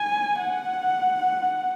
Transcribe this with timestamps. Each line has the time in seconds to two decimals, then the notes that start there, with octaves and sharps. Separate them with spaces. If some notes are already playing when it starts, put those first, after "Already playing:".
Already playing: G#5
0.39 F#5